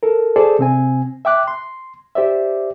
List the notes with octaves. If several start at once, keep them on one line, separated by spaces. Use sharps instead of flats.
A4 A#4
G#4 A4 C5 D5
C3 C4 G#5
E5 G5 D6 F#6
C6
G4 C5 D5 E5